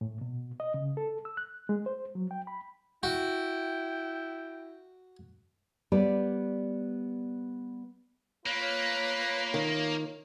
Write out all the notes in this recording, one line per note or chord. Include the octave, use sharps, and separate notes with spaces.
A2
B2
D#5
C#3
A4
E6
F#6
G#3
C5
F#3
G5
B5
E4 F#4 G5
G3 B3 B4 C5 D5
A#3 F4 B4 C#5
D#3